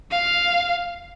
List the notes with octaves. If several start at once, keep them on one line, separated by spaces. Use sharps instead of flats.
F5